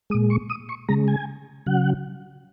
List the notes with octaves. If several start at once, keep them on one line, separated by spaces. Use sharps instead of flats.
A#2 G#3 D#6
C#6
D#6
C#6
C#3 G#3 A#5
G#5
C#3 F#3 F#5